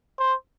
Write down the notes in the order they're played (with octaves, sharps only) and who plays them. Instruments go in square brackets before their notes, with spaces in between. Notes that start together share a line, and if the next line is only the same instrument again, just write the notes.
[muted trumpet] C5